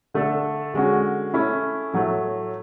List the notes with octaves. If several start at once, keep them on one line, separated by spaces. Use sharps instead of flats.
D3 A3 D4 A4
D3 G#3 C#4 F#4
A3 C#4 E4
A2 F#3 A3